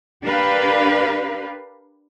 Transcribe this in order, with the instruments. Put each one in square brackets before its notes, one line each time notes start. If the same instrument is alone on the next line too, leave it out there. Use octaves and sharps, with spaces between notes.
[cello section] D4 G4 A#4 B4 F5